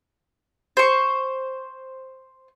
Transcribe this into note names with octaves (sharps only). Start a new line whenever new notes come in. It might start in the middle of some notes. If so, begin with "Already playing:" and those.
C5 C#6